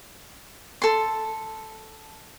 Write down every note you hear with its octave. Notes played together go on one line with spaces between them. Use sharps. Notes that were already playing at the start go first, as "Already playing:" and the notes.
A4 C6